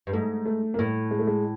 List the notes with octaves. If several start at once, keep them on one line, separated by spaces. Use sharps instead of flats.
G2
G#2 A3
A3
A#3
A2 A3
G#3
A3
G#3